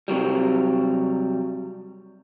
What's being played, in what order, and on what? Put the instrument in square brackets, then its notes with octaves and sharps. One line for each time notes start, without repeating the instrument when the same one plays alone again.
[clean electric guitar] C3 F#3 G3